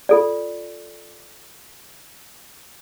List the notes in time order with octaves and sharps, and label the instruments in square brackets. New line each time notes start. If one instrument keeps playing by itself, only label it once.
[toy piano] F4 A4 D5